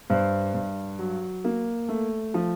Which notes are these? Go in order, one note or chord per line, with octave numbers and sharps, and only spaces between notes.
G2 C5
G2
F#3
A#3
A3
F3